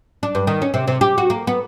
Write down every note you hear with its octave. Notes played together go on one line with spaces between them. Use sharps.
D4
G2
D#3
C#4
C3
C3
G4
F#4
A#3
B3